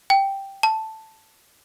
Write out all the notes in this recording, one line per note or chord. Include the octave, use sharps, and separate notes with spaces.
G5
A5